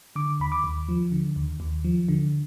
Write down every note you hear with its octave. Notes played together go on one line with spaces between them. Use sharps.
D3 D6
D#2 B5
D6
D#2
F3
D3
D#2
D#2
F3
D3